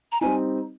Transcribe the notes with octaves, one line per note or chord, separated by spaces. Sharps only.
A#5
G3 C4 D#4 G#5